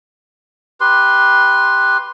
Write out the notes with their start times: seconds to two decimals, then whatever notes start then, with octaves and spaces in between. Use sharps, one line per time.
0.80 G4 B4 C6